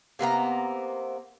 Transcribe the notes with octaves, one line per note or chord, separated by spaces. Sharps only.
C3 A#3 B3 A#5